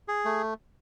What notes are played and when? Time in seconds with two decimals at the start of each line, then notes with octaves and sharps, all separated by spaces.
0.08 G#4
0.25 A3